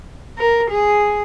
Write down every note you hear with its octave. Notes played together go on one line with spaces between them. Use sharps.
A#4
G#4